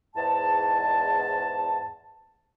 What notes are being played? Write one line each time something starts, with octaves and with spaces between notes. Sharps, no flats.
E2 G#2 A5